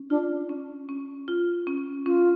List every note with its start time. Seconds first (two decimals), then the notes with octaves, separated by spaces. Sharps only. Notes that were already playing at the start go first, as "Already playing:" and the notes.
Already playing: C#4
0.10 D4 F4
0.49 C#4
0.89 C#4
1.28 F4
1.67 C#4
2.06 C#4 F4